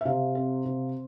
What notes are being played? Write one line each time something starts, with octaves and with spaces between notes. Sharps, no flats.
E5
C3 F5
C4
C3